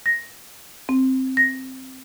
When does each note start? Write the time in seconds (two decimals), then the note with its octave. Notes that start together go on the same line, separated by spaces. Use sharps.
0.06 A#6
0.89 C4
1.37 A#6